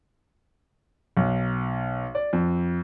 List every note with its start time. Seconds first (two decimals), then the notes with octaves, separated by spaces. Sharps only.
1.17 B1
2.15 D5
2.33 F2